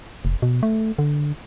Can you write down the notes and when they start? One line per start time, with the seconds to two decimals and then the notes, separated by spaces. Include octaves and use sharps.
0.25 F1
0.42 B2
0.63 A3
0.99 D3